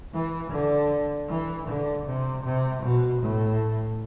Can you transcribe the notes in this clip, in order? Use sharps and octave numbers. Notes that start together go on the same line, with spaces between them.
E3
D3
E3
D3
C3
C3
B2
A2